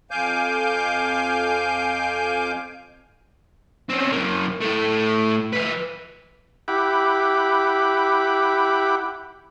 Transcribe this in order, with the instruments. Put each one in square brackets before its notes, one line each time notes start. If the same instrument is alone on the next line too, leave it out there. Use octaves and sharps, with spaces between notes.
[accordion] F2 F5 G#5 D6 G6
[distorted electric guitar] C4 C#4
F#2 A#3
A2 A3
F3 B4
[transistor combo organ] E4 G4 F#5 B5 D6